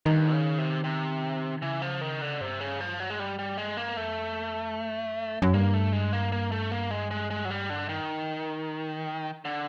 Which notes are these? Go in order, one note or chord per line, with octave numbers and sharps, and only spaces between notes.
G2 D#3
C#3
C3
C3
C#3 E3
F3
D#3
D3
G2 C3
C#3
F3
F#3
G#3
G3
G3
G#3
A#3
F2 A3
F#2
F#2
G2 A#3
A3
G#3
A#3
A#3
A3
A#3
G#3
G#3
G#3
F#3
G3
D3
D#3
D3